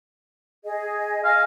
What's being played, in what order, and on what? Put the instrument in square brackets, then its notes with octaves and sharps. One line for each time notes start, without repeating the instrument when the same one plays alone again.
[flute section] G#4 D#5
[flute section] D#5 G#5 [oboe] F5